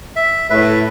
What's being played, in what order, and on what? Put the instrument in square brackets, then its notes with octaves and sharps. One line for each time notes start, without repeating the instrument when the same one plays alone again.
[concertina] E5
[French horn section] A2 [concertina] B4 E5